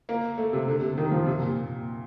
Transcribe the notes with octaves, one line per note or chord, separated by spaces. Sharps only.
A#3
A3
C3
D3
C3
D#3
F3
C3
A#2